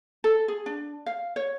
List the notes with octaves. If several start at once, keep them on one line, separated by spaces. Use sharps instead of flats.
A4
G#4
D4
F5
C#5